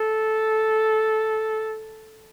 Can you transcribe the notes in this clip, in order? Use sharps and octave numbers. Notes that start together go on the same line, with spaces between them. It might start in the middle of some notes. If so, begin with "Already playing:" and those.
Already playing: A4